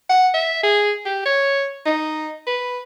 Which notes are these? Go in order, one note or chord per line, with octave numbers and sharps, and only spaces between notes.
F#5
E5
G#4
G4
C#5
D#4
B4